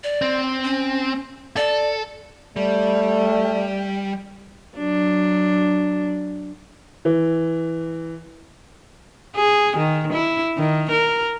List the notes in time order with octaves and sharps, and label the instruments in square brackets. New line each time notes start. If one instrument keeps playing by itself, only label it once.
[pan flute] D5
[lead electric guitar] C4
[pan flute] C#4
[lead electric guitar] A4 [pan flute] D5
[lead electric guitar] G3 [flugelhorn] A3 [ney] D5
[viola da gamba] F#3 D4
[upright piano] E3
[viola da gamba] G#4
D#3
E4
D#3
A#4